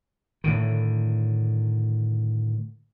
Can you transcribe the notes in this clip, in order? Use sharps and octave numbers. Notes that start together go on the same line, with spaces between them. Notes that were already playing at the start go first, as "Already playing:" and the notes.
A2 D3 D#3